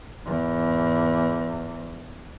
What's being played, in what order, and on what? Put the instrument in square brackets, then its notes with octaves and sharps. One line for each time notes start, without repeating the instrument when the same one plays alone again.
[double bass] E2 G#2